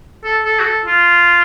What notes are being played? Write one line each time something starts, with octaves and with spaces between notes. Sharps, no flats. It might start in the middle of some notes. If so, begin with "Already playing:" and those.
A4
A4
F#4
A4
F4